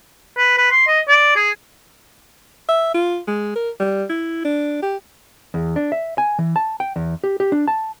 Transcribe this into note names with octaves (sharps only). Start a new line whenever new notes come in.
B4
B4
C6
D#5
D5
G#4
E5
F4
G#3
A#4
G3
E4
D4
G4
E2
D4
E5
G#5
E3
A5
G5
E2
G4
G4
D4
A5